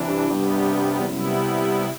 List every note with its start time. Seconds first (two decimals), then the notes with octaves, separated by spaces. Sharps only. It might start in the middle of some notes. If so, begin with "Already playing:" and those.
Already playing: C3 E3 D4
0.08 G2
0.18 G2
0.29 G2 C3 G3 B3
0.99 E2
1.09 F#2 C3 G3 B3 E4